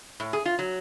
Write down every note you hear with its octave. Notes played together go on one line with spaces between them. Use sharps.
A2
G#4
F4
F#3